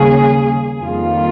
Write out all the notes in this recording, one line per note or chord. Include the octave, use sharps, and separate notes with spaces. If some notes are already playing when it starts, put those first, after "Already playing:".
Already playing: D#2 C#3 G3 A#3 C#4 G#4
F2 D#3 G3 A#3 F4